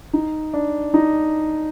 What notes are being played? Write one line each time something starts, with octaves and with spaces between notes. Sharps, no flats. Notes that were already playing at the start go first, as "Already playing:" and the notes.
D#4
D4
D#4